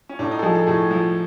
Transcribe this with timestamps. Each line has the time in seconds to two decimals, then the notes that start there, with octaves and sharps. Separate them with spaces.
0.09 C#4
0.19 A2 D4
0.31 D#4
0.39 A4
0.43 F3 G#4
0.55 A4
0.67 A2 G#4
0.91 F3